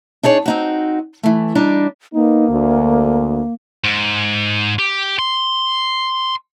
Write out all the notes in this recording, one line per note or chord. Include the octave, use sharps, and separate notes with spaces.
D4 D#4 G#4 C#5
C4 D#4 F#4
E3 A3
G3 D4 D#4
A#3 B3 D#4
D2
G#2
G4
C6